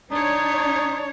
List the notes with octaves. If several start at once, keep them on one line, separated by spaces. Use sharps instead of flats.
D4 D#4 C#5